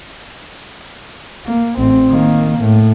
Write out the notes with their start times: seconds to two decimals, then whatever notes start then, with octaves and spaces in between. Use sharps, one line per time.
1.46 A#3
1.77 A1 C4
2.10 D#3 A#3
2.61 A2